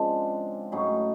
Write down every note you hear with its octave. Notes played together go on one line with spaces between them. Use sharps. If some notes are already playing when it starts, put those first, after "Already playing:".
Already playing: C#3 F3 G#3 C4 D4
A2 F#3 C#4 D#4